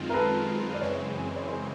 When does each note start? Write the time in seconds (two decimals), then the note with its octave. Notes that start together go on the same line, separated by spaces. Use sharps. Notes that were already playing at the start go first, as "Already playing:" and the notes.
Already playing: F#2 D#3 G#3 C4 F4
0.10 A#4
0.14 A4 B4
0.74 D5
0.81 F#2 C#3 E3 G#3 C4 B4 C#5
1.36 C#5
1.48 A#4 C5